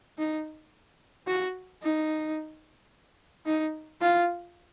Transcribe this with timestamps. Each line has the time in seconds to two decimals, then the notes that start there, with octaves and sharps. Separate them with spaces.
0.18 D#4
1.27 F#4
1.82 D#4
3.46 D#4
4.01 F4